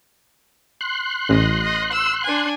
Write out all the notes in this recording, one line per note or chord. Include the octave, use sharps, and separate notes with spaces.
C6 F#6
A1 D#5
D#5
E6
D4 G#5